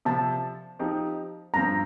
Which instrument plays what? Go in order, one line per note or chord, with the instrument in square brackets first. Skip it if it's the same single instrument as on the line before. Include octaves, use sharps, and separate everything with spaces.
[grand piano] C3 F3 C4 [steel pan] A5
[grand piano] F3 C4 D#4 G4
[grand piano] G2 F3 C4 [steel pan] A#5